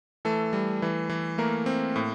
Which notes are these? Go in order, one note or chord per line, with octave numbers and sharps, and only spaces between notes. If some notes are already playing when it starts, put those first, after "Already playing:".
E3 A3 A4
G3
E3
E3
A3 A#3 A#4
C4
A2